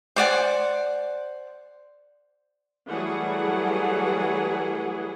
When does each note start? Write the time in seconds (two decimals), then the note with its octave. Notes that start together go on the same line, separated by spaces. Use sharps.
0.16 C5 D5 F#5 G#5
2.89 E3 F#3 G3 A3 G#4 F#5